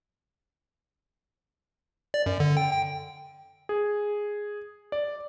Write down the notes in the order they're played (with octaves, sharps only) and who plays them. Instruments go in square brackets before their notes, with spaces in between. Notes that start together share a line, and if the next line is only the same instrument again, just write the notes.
[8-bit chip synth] D5
F#2
D3
G5
G5
[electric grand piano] G#4
D5